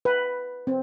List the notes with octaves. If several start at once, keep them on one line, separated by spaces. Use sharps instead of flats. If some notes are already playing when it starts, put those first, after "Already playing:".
B4
C4